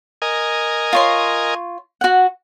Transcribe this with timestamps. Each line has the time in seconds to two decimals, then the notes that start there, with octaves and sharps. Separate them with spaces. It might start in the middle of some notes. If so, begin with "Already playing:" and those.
0.22 A#4 D#5 G#5
0.93 F4 C#5 C6
2.01 F#4 F#5